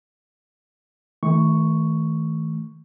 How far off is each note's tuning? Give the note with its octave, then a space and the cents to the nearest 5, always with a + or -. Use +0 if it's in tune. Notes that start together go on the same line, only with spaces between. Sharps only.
D#3 +45 A3 +0 C#6 +0